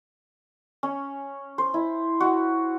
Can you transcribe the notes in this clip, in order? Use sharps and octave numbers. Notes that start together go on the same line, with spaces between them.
C#4
C5
E4
F#4